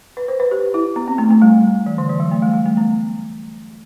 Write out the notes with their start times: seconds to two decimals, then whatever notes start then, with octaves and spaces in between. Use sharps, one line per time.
0.17 B4
0.28 C5
0.40 B4
0.51 G4
0.74 E4
0.96 B3
1.08 C4
1.18 A3
1.31 A3
1.42 G3
1.86 E3
1.98 D3
2.10 E3
2.20 F#3
2.31 A3
2.42 G3
2.54 G3
2.66 A3
2.77 B3